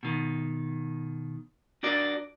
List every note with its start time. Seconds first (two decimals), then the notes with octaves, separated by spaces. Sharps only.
0.03 B2 D#3
1.83 D4 F#4 A#4 D5